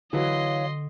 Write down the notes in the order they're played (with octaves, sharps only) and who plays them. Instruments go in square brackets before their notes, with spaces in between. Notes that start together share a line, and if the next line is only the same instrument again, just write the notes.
[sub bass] D3 [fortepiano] E3 F#3 [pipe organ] C#5 F5 [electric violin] D#5 C6